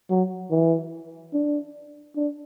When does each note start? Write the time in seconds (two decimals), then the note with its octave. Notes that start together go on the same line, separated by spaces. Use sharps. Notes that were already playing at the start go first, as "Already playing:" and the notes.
0.10 F#3
0.51 E3
1.33 D4
2.16 D4